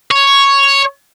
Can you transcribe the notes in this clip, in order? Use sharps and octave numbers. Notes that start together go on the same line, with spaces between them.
C#5